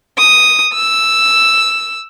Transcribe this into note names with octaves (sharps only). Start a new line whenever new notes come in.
D#6
E6